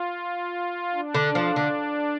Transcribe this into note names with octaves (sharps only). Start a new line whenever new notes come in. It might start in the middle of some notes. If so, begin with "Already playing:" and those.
Already playing: F4
D4
D3
F3
D3